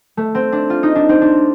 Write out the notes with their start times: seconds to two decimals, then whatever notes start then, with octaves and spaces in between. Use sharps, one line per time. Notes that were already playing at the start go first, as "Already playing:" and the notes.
0.17 A3
0.35 C4
0.52 D4
0.70 F4
0.83 D#4
0.96 D4
1.09 C4
1.21 D4